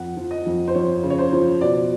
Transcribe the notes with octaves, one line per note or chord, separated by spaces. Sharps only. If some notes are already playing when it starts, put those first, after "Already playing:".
Already playing: F2 F#5
F3
D#5
F2
C5
F2 C#5
C#3
C#5
C5
F3
B2 D5